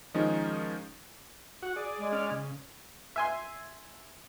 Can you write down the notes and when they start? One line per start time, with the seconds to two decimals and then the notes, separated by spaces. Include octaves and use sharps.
0.14 D#3 F3 G#3 C#4 D#4
1.63 F#4 F#5
1.76 G#4 D5
1.99 G#3
2.12 C#4 D5 F6
2.31 C#3
3.16 E5 G#5 C6